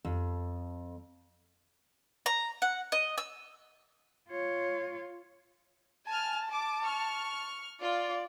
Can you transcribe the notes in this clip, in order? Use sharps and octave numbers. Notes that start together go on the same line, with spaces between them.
F2
A#5
F#5
D#5
E6
F4 C#5
G#5 A5 F6
A5 D6
C#6 F6
F4 D5